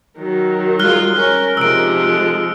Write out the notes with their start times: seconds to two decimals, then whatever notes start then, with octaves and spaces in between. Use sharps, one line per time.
0.18 D#3 F#3
0.79 G3 G#3 F4 F6 F#6 G7
1.15 C#4 A#4
1.57 C3 F3 G#3 D#4 E6 D7
2.06 A4